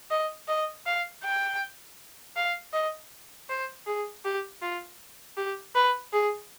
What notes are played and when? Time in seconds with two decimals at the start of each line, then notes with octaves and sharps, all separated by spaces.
0.10 D#5
0.48 D#5
0.86 F5
1.24 G5
2.36 F5
2.73 D#5
3.49 C5
3.86 G#4
4.25 G4
4.62 F4
5.37 G4
5.75 B4
6.13 G#4